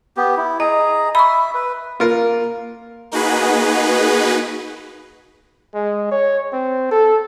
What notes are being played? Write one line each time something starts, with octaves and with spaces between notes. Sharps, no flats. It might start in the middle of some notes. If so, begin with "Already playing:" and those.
B3 G4
E4
G#4 D#5 A#5
E5 B5 C#6
B4
A#3 F4 A#4
A#3 D#4 F#4 G#4 B4
G#3
C#5
C4
A4